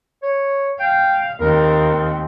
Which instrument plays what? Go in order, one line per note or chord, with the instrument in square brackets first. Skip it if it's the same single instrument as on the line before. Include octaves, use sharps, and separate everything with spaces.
[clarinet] C#5
[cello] F5 [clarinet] G5
[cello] D#2 C4 [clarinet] A#4